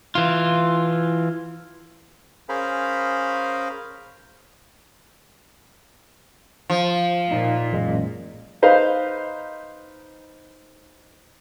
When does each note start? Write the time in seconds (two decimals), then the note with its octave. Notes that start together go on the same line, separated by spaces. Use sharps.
0.15 E3 F4
2.49 C#4 G#4 A#4 C5 F5 B5
6.70 F3
7.31 A#2 D#4
7.72 A1 F#2 G#3
8.62 D#4 B4 C5 D#5 F5